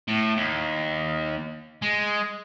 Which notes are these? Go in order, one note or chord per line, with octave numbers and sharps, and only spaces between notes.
A2
D#2
G#3